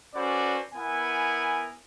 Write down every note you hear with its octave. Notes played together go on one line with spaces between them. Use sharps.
C#4 F#4 A4 B4 C5 D5
B3 E4 A#4 F#5 G#5